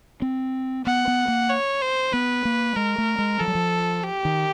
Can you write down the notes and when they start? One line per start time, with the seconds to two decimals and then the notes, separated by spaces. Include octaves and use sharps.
0.22 C4
0.86 B3 F#5
1.08 B3
1.28 A#3
1.50 C#5
1.82 C5
2.13 B3 B4
2.45 A#3
2.76 G#3 A#4
2.98 A3
3.19 G#3
3.40 F3 A4
3.48 F#3
3.55 F3
4.03 G4
4.25 D#3